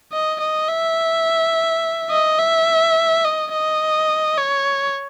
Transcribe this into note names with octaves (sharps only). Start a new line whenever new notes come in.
D#5
D#5
E5
D#5
E5
D#5
D#5
C#5